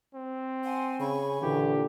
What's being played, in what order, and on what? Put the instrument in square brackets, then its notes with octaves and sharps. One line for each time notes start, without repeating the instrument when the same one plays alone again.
[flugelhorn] C4
[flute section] F#5 G#5 C6
[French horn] C#3 [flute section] G#5 B5 C#6
[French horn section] A#2 D3 [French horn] E3 [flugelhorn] G4